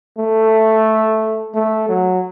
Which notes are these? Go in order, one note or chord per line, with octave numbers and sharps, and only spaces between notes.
A3
A3
F#3